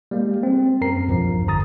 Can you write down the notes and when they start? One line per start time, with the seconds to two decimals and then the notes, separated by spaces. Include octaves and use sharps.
0.11 G3 G#3 A#3
0.43 C4
0.81 F#2 A#4 A#5 C7
1.08 B1 E2 G2 F3
1.47 G1 D3 A#5 D#6 A6